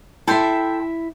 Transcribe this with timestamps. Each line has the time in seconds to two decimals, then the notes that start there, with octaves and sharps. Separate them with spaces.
0.27 E4 A4 E5 G5 C6